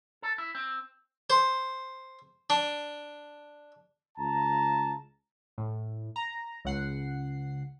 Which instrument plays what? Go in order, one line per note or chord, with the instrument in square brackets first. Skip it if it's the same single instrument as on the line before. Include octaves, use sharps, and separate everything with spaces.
[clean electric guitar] A4
E4
C4
[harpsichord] C5
D4
[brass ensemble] C#2 A5 A#5
[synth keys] A2
A#5
C#2 F#5 C7